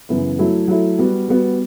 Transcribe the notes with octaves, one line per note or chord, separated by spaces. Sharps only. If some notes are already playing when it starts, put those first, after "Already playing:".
F#2 C#3 E3 B3 E4
F#3 A3 E4 A4
F#3 A3 E4 A4
G3 B3 F#4
G3 B3 F#4